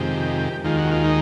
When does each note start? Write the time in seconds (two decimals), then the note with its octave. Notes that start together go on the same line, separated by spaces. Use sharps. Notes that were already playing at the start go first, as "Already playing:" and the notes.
Already playing: F2 C3 D#3 G#3 G4
0.64 D#2 D#3 G#3 F4
0.78 F#4
0.91 F4
1.04 D#4